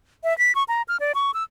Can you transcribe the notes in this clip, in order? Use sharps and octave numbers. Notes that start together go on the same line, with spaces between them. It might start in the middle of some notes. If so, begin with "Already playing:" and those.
E5
B6
C#6
A#5
F6
D5
C#6
E6